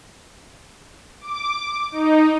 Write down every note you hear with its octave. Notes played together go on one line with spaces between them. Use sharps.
D6
D#4